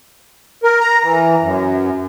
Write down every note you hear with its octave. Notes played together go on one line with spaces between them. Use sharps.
A#4
A#5
E3
F#2